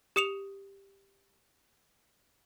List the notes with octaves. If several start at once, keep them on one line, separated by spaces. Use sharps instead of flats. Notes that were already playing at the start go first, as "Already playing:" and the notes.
G4 D#6 C#7 E7 F7